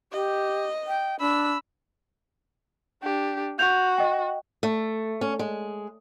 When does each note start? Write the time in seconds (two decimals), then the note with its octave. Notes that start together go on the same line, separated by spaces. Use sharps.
0.13 G4 D#5
0.87 G5
1.20 D4 B5 E6
3.03 D4 G4
3.59 F#4 G6 F7
3.98 D#5 G5
4.63 A3
5.21 C#4
5.39 G#3